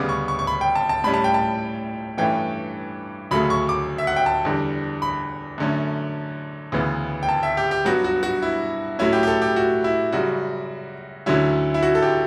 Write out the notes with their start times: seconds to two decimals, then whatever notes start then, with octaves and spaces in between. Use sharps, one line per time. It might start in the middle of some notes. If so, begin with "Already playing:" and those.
Already playing: D2 C#3 G3 B3 D6
0.09 C#6
0.28 C#6
0.39 C#6
0.47 B5
0.61 G5
0.75 A5
0.89 A5
1.04 A2 G3 C#4 B5
1.14 A5
1.24 G5
1.34 A5
2.18 G2 E3 A3 C#4 G5
3.31 D2 C#3 F#3 A3 B5
3.50 C#6
3.69 D6
3.98 E5
4.07 F#5
4.16 G5
4.26 A5
4.45 E2 D3 G3
5.02 B5
5.58 F#2 D3 A3 C#4
6.72 D2 C#3 E3 B3
7.23 G5
7.29 A5
7.43 E5
7.57 G4
7.71 G4
7.85 G2 F#3 B3 F#4
8.04 F#4
8.23 F#4
8.42 E4
8.99 A2 F#3 A3 C#4 E4
9.13 G4
9.23 G4
9.27 A4
9.42 G4
9.56 F#4
9.84 E4
10.13 F#2 C#3 G3 F#4
11.26 D2 D3 F#3 C#4 E4
11.74 E4
11.83 F#4
11.95 A4
12.02 G4